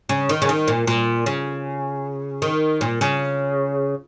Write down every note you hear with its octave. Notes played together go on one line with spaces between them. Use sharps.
C#3
D#3
C#3
D#3
A#2
A#2
C#3
D#3
A#2
C#3